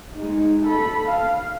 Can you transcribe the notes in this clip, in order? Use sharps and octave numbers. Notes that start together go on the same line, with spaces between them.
G#3 D#4
A4 B5
F5